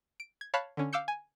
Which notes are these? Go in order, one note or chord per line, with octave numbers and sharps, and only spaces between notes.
D7
G#6
C#5 F5 A5 B5 F#6
D3 C#4
F5 D6 E6 G6 C#7
G#5